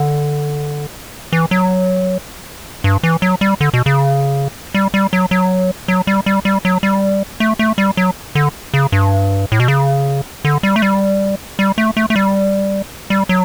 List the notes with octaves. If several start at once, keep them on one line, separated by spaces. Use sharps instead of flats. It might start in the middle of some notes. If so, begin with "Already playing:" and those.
Already playing: D3
E3
F#3
G2
E3
F#3
G3
D3
B2
C#3
G3
G3
F#3
F#3
F#3
G3
G3
G3
F#3
G3
A3
A3
G3
F#3
D3
C#3
G2
A2
B2
C#3
D3
G3
A3
G3
G3
A3
A3
A3
G3
G3
F#3